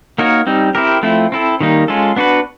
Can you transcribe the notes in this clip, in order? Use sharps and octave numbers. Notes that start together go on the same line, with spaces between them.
A#3 D#4 F#4 A#4 C#5
G3 C4 D#4
C4 E4 G4 A#4
F3 A3 C4 E4
C4 E4 A4
D#3 G3 A#3 D#4
G#3 C#4 F4 A4
B3 D4 F#4 B4